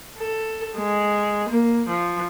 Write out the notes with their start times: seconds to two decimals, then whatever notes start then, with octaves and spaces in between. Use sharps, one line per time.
0.18 A4
0.76 G#3
1.49 A#3
1.89 F3